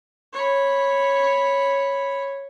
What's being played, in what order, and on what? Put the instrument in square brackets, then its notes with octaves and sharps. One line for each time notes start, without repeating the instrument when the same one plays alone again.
[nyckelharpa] C#5 B5